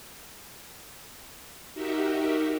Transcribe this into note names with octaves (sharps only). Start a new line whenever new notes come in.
D#4 F#4 G4 A#4 E5